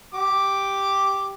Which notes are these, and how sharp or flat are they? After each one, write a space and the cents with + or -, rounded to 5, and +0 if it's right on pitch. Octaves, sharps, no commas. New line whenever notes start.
G4 +0 D6 +0